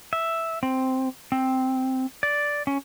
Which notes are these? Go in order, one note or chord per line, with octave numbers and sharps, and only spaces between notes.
E5
C4
C4
D5
C#4